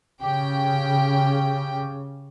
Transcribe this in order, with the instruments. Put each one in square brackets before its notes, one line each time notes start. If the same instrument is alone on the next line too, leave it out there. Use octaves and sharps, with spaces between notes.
[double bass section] C#3 [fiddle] G4 G5